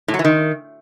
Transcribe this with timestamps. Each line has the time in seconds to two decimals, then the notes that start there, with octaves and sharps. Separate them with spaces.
0.08 A2
0.14 F#3
0.19 E3
0.25 D#3